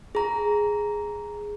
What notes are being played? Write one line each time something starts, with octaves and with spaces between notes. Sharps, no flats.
G#4 A#5